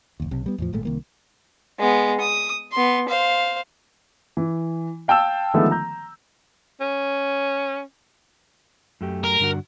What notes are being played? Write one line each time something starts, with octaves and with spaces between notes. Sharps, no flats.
F#1 D#2
B1 C3
G3 B3
E2 A2 F3
G#1 A#2 G#3 A3
C2 D#3 A#3
G#3 B3
D#6
B3 C6
C5 F5
E3
F5 G5 A5 E6 E7
D3 D#3 F3 G#3 A3 B3
A#5 G6
C#4
F#2 A3 G4
A#4
G2 D3 F#4